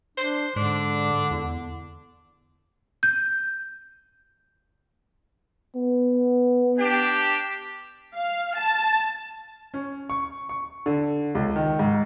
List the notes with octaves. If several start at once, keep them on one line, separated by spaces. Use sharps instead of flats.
D4 C5
G#2 D3 D4
E2
G6
B3
D4 G4
F5
A5
C#4
C#6
C#6
D3
C#2
D#3
G#2